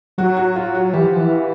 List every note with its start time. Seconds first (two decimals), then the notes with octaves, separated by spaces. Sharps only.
0.18 F#3 F#4
0.37 F#4
0.56 F4
0.75 F#4
0.93 E3 G4
1.05 F3
1.16 E3